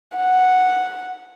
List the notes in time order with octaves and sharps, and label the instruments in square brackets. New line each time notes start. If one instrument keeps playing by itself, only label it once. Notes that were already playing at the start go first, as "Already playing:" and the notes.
[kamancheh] F#5